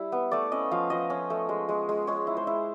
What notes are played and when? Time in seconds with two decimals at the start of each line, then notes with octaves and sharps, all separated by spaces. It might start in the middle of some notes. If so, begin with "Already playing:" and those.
Already playing: G3 E4
0.12 B3
0.31 A3 D5
0.52 C#4 D#5
0.71 F3 F5
0.90 F3 D#5
1.10 C#4
1.30 A3
1.49 G#3
1.69 G#3
1.89 G#3
2.07 G#3 C#5
2.27 E4
2.37 C5
2.47 E4